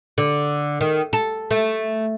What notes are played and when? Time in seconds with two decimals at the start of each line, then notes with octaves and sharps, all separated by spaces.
0.18 D3
0.81 D#3
1.13 A4
1.51 A3